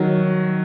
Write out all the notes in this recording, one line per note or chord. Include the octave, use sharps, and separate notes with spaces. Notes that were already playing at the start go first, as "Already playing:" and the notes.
Already playing: D#3 F#3